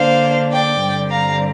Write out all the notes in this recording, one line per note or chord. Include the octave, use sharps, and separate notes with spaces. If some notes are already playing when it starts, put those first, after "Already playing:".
Already playing: D3 A#3 D4 C5 F5
D5 G5
G2 D3 G3 C4
F5 A#5